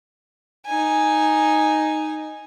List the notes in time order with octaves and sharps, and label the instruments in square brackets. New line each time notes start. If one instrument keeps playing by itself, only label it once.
[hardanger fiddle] D#4 G#5